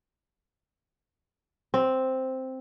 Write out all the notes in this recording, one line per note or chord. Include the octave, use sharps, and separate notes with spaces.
C4